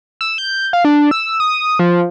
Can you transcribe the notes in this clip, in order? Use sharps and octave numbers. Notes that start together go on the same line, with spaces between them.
E6
G6
F5
D4
E6
D#6
F3